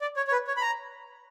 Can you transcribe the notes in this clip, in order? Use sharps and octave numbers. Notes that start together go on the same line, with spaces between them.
D5
C#5
C#5
B4
C#5
B5
A#5